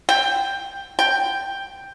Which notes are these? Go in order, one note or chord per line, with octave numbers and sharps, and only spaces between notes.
G5
G5